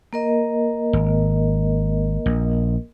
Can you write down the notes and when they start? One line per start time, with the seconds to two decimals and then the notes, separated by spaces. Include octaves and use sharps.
0.13 A#3 A#4 D#5
0.93 G#1
2.26 A#1